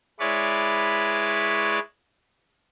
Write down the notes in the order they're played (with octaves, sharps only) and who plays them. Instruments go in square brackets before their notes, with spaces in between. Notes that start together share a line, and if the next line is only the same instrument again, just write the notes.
[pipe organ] G#3 E4 B4 C#5 D5